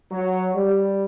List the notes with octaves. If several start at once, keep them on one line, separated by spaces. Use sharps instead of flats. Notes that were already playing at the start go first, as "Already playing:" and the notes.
F#3
G3